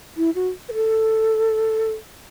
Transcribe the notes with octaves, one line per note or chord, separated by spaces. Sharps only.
E4
F#4
B4
A4